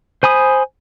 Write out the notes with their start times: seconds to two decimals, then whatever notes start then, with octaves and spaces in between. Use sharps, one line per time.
0.23 C5 G#5 B5 D#6